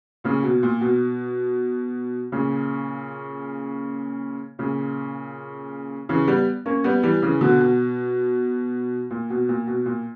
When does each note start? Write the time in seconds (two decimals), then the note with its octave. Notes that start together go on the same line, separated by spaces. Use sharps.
0.24 A#2 C#3
0.43 B2
0.63 A#2
0.81 B2
2.32 A#2 C#3
4.59 A#2 C#3
6.09 C#3 E3
6.27 G3 B3
6.66 A#3 C#4
6.84 G3 B3
7.03 E3 G3
7.22 C#3 E3
7.41 B2 D3
7.60 B2
9.10 A#2
9.30 B2
9.49 A#2
9.67 B2
9.86 A#2